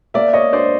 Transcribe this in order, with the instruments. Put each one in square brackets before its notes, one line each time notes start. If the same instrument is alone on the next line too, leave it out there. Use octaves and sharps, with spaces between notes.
[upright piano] A#3 D5 E5
C#5 D#5
D4 C5 D5